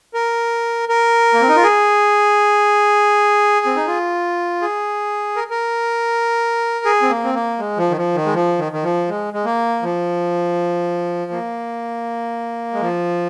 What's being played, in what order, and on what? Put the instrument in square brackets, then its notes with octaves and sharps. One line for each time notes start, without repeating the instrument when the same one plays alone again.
[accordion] A#4
A#4
A#3
C4
D#4
F4
G#4
C4
D#4
F4
G#4
A#4
A#4
G#4
C4
A#3
C4
A#3
G#3
F3
D#3
F3
D#3
G#3
F3
D#3
D#3
F3
G#3
G#3
A#3
F3
A#3
G#3
F3